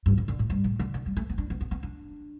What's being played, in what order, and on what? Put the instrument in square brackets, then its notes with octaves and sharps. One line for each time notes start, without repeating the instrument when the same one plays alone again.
[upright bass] G2
A2
D3
A2
G2
A2
D3
D3
G3
A3
B3
D4
B3
B3
B3
D4